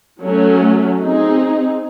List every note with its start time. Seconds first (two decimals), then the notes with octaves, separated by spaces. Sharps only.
0.22 F#3 A3 C#4
1.01 C4 D#4 G#4